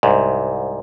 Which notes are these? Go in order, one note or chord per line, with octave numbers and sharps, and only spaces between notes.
C2 G#2